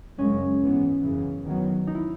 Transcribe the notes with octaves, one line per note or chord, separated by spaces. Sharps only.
F#2 C#3 G#3 C#4
G#2 E3 B3
F#2 C#3 E3
E2 D#3 F#3 B3
D#4
E4